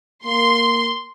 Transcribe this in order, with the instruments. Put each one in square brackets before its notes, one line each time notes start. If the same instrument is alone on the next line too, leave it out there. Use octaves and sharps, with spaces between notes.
[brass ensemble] A#3 [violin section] C6